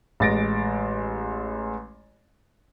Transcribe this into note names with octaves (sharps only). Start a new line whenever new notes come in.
A1 G#3 A6 A#6 D7